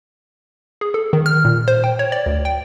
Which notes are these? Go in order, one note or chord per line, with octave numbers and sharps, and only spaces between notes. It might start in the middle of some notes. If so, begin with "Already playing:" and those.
G#4
A4
D#3
F6
A#2
C5
G5
C#5
D5
D2
G5